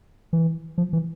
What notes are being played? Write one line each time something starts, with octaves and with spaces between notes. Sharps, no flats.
E3
F3
E3